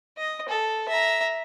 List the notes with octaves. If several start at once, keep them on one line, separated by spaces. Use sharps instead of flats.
D#5
A4
E5 A#5